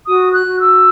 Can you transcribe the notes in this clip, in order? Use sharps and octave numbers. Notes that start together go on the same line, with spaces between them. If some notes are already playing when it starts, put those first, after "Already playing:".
F#4 D#6
F#6
F#4
E6